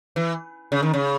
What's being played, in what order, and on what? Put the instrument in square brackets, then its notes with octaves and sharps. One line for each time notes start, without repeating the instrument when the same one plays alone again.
[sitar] E3
C#3
D#3
C#3